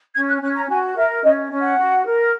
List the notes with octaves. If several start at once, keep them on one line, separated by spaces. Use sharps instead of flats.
C#4 G#6
F#6
C#4 F#6
A#5
F#4 G#5
A#4 E5
C#4 D#5
C#4
F#5
F#4
A#4